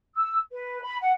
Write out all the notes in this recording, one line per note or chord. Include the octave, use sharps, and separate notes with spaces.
E6
B4
B5
F#5